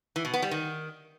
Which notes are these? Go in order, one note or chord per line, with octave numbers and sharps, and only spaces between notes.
E3
B2
B3
G3
D#3